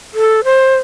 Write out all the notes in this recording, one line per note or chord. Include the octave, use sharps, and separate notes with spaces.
A4
C5